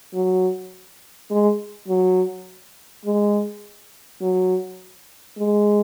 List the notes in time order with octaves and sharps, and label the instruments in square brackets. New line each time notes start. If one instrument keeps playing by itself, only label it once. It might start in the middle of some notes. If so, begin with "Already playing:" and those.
[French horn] F#3
G#3
F#3
G#3
F#3
G#3